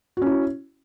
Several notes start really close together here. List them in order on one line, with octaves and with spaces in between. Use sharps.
F#4 C#4 E4